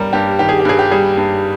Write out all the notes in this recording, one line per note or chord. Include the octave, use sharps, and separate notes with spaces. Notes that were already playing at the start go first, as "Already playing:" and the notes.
Already playing: G2 G3 A#4
G2 G4
D#3 G4
G#4
G4
G2 G#4
G4
G3 G#4
G2